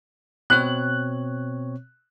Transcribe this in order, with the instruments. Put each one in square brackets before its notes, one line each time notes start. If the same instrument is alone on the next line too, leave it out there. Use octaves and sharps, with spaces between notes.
[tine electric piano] B2 C4 C#5 [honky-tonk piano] F#6